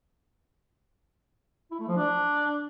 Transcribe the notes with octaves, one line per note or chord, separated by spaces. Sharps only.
E4
A3
F3
D4